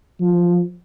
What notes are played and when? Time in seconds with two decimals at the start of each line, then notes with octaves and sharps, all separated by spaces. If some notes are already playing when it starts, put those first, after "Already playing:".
0.21 F3